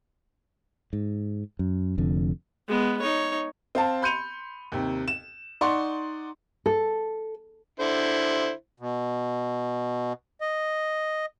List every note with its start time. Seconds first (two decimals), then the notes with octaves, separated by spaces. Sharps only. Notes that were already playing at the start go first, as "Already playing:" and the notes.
0.93 G#2
1.59 F#2
1.98 F1 F2 D3
2.68 G#3 B3
3.01 D#4 C#5
3.75 C4 F5 A5
4.02 B5 C6 G6 C#7 D#7 F7
4.72 D#2 C3
5.08 E7
5.61 D#4 D5 F#5 C6 C#6
6.66 A4
7.80 D3 E4 C5
8.80 B2
10.41 D#5